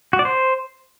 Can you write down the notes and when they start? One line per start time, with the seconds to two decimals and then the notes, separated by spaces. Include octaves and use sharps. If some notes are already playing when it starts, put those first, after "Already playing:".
0.13 F#4
0.19 D5
0.25 C5